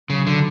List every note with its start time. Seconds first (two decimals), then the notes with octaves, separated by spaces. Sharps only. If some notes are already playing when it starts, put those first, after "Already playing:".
0.09 C#3 F#3
0.27 D3